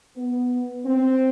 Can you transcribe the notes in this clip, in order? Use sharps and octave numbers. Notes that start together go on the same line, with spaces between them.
B3
C4